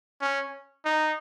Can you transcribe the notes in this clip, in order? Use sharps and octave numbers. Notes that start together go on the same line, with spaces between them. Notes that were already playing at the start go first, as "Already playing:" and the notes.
C#4
D#4